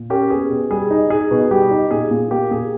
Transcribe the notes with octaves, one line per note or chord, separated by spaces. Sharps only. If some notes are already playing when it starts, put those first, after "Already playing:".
Already playing: A#2
C#4 G4 A#4
B3 G#4
B2
G3 G#4
D#4
D#4 G#4
B2
G3 G4
D#4
A#2 G#4
A#2
A#3 G4
A#2 G#4